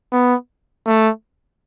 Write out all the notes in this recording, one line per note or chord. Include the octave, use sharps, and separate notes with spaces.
B3
A3